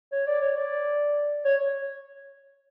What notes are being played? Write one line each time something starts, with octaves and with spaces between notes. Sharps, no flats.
C#5
D5
C#5
D5
C#5